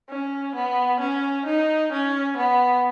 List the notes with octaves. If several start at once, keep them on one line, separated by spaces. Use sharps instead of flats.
C#4
B3
C#4
D#4
C#4
B3